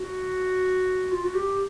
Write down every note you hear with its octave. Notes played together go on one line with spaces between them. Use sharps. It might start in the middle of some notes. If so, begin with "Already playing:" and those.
Already playing: F#4
F4
F#4
G4